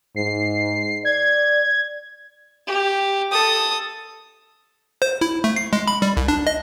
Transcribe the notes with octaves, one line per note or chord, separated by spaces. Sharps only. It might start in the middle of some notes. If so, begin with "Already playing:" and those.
G#2 C7
D5 G#6
G4
A4 D#6
C5
E4
A3
C7
G#3
B5
G3
C2
D4
D#5